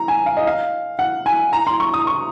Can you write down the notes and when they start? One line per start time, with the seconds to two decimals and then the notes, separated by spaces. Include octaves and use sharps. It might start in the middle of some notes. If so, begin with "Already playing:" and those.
Already playing: A#5
0.08 G#5
0.26 F5
0.37 D#5
0.47 F5
0.99 F#5
1.26 G#5
1.53 A#5
1.67 C6
1.80 C#6
1.94 D#6
2.07 C#6